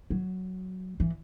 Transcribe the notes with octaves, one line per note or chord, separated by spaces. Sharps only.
F#3
E3